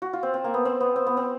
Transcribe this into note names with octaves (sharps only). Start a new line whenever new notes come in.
F#4
F4
C4
C4
A#3
B3
C4
B3
C4
B3
C4